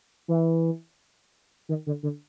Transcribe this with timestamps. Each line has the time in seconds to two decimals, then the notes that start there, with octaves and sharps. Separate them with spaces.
0.28 E3
1.69 D#3
1.87 D3
2.03 D3